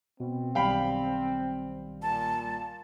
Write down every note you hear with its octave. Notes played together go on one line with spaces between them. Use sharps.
B2 C4
B1 D#3 G3 F5 G5 B5
A#2 A5